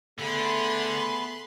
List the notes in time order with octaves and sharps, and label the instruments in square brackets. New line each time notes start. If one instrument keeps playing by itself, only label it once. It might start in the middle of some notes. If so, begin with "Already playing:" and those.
[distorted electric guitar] D3 [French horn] A3 [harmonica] B3 G#4 [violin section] B5 C6